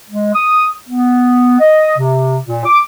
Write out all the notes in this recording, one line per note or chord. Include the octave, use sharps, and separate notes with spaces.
G#3
D#6
B3
D#5
C3
A#2
D6